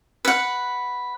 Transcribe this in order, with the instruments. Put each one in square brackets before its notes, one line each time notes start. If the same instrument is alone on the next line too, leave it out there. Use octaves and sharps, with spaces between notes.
[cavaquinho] B4 F#5